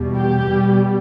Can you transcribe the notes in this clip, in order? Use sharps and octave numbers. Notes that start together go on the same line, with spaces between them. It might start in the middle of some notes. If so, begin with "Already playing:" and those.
Already playing: E2 B2 G3
G4
B2 G3